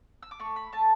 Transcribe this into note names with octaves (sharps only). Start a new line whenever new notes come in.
E6
D6
A3 C#6
B5
A3 A5